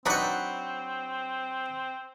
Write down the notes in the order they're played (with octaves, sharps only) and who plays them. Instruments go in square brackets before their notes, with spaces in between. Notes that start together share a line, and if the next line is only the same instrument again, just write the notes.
[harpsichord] F#3 F#5 [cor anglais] C4 [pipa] D4 D#4 B4